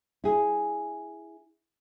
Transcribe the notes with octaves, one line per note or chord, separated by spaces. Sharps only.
E4 G#4